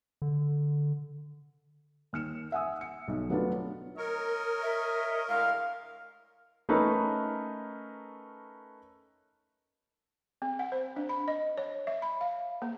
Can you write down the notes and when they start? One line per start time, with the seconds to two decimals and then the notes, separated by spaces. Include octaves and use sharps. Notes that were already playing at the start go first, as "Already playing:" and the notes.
0.22 D3
2.13 D#2 F6 C#7 E7
2.52 E5 F#5 G#5 D#6 E6
2.81 C#7
3.08 B1
3.30 F#3 A3 B3 D4 F4
3.97 A#4 C#5 D#5
4.62 E5
5.29 A2 D3 G#3 F5
6.69 A3 C#4 D#4 A#4 B4
10.42 C4
10.59 F#5
10.72 C5
10.96 D4
11.09 B5
11.28 D#5
11.58 C#5
11.87 E5
12.02 B5
12.21 F5
12.62 A#3